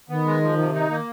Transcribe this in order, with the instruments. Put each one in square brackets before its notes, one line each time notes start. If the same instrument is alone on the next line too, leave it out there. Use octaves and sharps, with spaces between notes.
[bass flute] D#3 [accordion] B3
[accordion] G#3
F3
C3
D#4
A#3